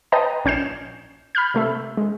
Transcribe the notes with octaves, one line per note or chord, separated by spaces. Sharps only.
B4 D#5 G5 A5 A#5
A#1 C#4 G6 C7 E7
B5 F6 G6
C3 A3 E5
G#3